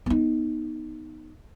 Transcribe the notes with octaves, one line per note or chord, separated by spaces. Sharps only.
B3 D#4